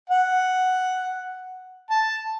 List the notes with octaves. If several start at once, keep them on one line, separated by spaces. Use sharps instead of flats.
F#5
A5